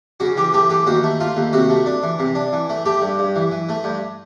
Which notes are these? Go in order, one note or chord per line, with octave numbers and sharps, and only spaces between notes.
C#3 F#4
E3 G4
A3 G4
E3 G4
D#2 F#4
A3
A3 F4
D#2
C3 F#4
A3
D4
E3
C3
D4
E3
A3
A3 G4
G2
G2
E3
E3
A3
G2